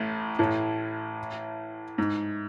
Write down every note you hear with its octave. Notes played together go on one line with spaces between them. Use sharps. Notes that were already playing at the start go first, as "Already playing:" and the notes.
Already playing: A1 A2
A1 A2
G#2